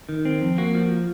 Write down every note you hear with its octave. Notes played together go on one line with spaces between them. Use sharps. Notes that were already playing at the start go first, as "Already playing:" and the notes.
D#3
C4
F2
A#3 F#4
F3